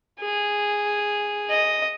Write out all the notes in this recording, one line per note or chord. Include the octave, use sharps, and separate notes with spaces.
G#4
D#5